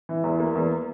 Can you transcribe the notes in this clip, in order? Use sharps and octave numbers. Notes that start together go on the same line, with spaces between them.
E3
E2
A#3
E2